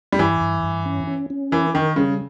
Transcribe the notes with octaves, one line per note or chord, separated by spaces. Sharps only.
G3
G2 E3
G2
G2
C#4
C#4
C#4
E3 A#4
D#3 A#4
C#3 G3